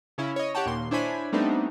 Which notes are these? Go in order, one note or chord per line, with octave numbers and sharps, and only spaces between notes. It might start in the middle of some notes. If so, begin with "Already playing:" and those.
C#3 C#4 E4
C#5 D#5
G4 C#5 F#5 G5 A5
D#2 A#2 C6
D4 E4 C5 C#5 G#5 B5
G3 A3 B3 C4 D4 D#4